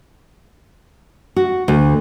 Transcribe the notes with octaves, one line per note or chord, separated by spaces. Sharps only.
F#4
D2